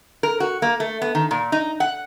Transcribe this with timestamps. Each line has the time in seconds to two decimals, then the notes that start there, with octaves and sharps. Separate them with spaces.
0.23 A#4
0.40 F#4
0.62 A#3
0.80 A3
1.02 B3
1.15 D#3
1.31 A#2
1.52 D#4
1.80 F#5